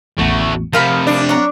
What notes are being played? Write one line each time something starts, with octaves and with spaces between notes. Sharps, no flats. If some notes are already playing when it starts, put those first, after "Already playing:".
A1 E2 A3 F#4
C3 F3 A#4 F5 B5 C6 D#6 C#7
D4
A#4 C#5 F#5 A#5 F#6